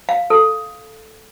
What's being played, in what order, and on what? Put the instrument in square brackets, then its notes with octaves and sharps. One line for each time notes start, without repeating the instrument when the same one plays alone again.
[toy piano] F5
A4